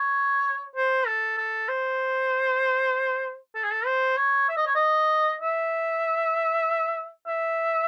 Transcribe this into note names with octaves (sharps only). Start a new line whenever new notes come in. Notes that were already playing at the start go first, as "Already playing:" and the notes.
Already playing: C#5
C5
A4
A4
C5
A4
G#4
A4
C5
C#5
E5
D#5
C#5
D#5
E5
E5